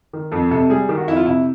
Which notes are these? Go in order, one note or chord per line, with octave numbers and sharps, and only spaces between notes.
D#3
F2 A4
C3 A4
G3 G#4
D#3 G4
F#4
F2 E4
F4
C3 E4